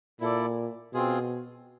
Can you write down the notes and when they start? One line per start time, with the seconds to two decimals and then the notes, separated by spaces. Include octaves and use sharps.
0.20 A#2 E4 A4 D5
0.93 B2 C4 F4 G#4